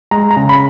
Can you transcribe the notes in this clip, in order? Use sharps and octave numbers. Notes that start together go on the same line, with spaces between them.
G#3 A#5
A#5
C#3
B5